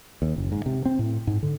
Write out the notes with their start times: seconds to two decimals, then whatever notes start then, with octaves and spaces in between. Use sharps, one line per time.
0.22 D#2
0.36 F#1
0.52 G#2
0.66 C3
0.85 C4
0.99 A2
1.27 G#2
1.43 D3